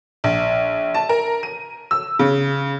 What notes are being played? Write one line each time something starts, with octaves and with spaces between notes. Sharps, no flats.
A#1
A5
A#4
D#7
E6
C#3